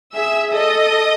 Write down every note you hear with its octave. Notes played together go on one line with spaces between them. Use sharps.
G#4 E5 E6
A4 D#5 D#6